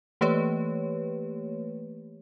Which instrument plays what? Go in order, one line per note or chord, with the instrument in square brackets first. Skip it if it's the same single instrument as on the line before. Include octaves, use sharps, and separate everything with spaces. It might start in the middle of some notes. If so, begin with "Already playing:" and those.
[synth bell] E3 A3 A#3 G4 B4 C#5